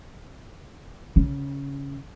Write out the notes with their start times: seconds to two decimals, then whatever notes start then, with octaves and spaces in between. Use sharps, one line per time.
1.16 C#3